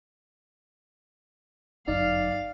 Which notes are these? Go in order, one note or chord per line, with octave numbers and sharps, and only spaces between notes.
G1 F#2 D#4 D5 F5